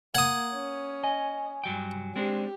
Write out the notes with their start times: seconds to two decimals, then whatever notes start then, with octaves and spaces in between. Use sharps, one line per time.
0.15 A#3 F#5 D#6 G#6
0.53 C#4
1.04 D#5 G#5
1.64 G2 F#3 G5
2.16 G#3 C4 D4 G4